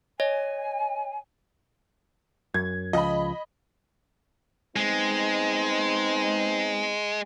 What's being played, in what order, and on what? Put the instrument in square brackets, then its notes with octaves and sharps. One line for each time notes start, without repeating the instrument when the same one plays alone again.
[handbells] C#5 D#5 A#6 [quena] G#5
[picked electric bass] F#2 [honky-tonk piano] G#6
[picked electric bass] C#2 F3 [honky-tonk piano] D#5 B5
[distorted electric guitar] G#3 [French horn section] B3 C4 D#4